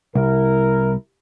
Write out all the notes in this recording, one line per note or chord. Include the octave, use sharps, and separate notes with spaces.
C2 E4 A#4